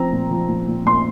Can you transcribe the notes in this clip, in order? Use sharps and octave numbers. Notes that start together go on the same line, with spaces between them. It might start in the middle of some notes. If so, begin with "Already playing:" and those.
Already playing: F3 C4 A#5
A#2
F3
A#2
A#2
A#2 C6